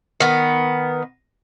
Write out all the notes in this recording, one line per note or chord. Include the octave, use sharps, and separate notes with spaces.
D#3 B3